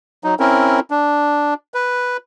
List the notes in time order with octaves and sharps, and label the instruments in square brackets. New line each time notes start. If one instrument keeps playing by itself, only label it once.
[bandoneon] F#3 D#4
C4 C#4 E4 A#4
D4
B4